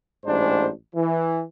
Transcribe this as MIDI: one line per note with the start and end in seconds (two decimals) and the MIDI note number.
0.25 0.68 33
0.25 0.68 44
0.25 0.68 62
0.25 0.68 72
0.95 1.42 52